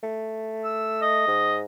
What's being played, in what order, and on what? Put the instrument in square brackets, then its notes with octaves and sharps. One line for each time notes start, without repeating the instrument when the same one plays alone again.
[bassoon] A3
[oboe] E6
D#5
[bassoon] G#2